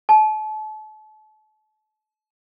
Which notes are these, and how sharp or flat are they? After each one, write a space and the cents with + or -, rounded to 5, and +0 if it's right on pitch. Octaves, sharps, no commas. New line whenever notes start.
A5 -35